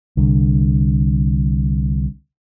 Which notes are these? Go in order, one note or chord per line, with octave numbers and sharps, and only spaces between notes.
C2 D3